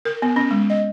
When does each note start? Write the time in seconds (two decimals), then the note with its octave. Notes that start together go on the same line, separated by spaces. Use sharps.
0.05 A#4
0.22 B3
0.36 C#4
0.51 G#3
0.70 D#5